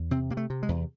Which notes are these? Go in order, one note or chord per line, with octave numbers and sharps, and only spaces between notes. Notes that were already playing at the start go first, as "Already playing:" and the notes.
Already playing: E2
C3 C4
C3 A#3
A3
C3
G#3
E2